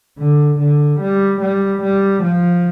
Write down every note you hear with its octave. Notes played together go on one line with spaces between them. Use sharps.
D3
D3
G3
G3
G3
F3